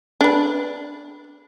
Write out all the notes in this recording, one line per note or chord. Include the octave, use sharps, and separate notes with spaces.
D4 B4